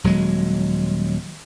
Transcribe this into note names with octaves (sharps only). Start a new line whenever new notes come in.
D#1 F#3 G#3